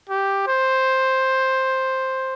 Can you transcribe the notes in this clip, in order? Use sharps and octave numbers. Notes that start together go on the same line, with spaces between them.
G4
C5